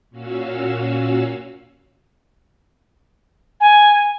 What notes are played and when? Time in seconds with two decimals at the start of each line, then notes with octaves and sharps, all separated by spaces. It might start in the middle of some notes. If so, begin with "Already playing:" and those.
0.10 A#2 C#4 F#4 F5 E6
3.61 G#5